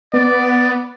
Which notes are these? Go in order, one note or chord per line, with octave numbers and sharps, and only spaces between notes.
B3 D5